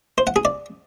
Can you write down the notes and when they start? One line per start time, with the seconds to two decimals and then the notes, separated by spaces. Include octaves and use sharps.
0.18 C5
0.27 F#5
0.36 G#4
0.45 D5